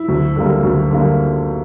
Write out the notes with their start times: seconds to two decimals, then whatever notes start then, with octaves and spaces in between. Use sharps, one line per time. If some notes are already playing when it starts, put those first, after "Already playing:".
Already playing: E4
0.08 D2
0.36 D3 G3 A#3
0.63 D2
0.91 D3 G3 A#3